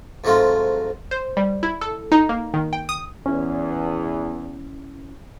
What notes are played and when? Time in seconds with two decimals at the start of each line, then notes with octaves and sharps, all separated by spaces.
0.24 G#2 F#3 A3 C4 F4
1.11 C5
1.37 G3
1.63 E4
1.81 A4
2.12 D#4
2.29 A#3
2.54 D#3
2.73 G5
2.89 D#6
3.26 E2 C#4 E4